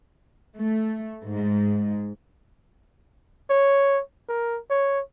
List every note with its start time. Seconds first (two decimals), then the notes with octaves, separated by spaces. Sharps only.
0.57 A3
1.23 G#2
3.50 C#5
4.28 A#4
4.70 C#5